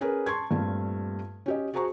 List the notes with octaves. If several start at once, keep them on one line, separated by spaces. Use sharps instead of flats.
C#4 G#4 A#4 B4
A5 C6 C#6 G#6
G2 A#2 A3 C4 F4
C#4 G4 D#5
F#4 G#4 C5 A#5 C#6